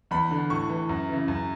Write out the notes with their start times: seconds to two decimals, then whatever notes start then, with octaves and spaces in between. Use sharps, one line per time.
0.11 E2 B5
0.31 D3
0.50 A2 C#6
0.69 E3
0.89 F#2
1.08 C#3 E3
1.28 F#2